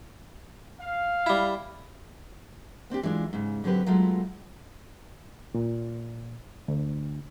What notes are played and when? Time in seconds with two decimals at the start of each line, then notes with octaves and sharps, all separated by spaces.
0.80 F5
1.26 G3 E4
2.90 B3 C4 D4 G4
3.03 E3 G#3 D4 F4
3.33 G#2 C#3
3.64 D3 F#3 C4 G4 B4
3.86 F#3 G#3 A3 B3 F4
5.54 A#2
6.68 D2